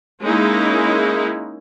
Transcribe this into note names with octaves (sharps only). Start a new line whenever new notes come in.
G#3 A#3 C#4 D#4 E4